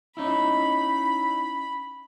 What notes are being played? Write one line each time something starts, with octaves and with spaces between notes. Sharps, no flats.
C#4 D#4 E4 B5